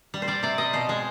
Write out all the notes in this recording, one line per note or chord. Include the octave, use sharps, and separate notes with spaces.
G3
C5
G3 D5
C3 D5
G3 D#5
B2 C5
G#3